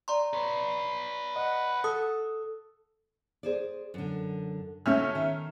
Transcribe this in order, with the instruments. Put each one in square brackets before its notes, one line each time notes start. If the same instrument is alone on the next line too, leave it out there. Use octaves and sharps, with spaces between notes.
[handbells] D5 A#5 C6
[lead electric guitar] B4 C#5
[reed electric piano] D#5 [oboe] F#5
[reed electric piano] A4 [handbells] D#6
[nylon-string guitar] G#4 C5 D5
F#2 D3
[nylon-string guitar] C#3 A#3 F#4 [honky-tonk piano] A3 C#4 F6
[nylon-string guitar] D#3